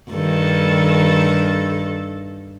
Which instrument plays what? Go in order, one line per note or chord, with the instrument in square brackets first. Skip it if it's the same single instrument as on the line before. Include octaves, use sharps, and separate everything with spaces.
[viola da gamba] G2 D#3 A4